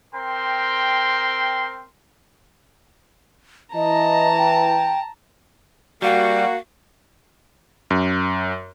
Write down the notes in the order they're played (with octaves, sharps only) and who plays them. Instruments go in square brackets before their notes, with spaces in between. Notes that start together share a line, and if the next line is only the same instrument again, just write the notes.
[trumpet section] C4 A#4 G5 C6
[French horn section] E3 [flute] D#5 [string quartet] A5 A#5
[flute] G5
[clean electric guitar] G3 [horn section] A#3 F#4 [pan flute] F5
[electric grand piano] F#2